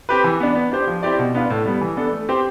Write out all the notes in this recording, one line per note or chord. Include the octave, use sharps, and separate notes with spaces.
C4 G4 B4
E3
B3 D4
B3
D4 G4 C5
F3
C4 E4 G4 D5
B2
B3 D4 F4
A2
G3 B3
E3
B3 D4 A4
A3
C4 G4 C5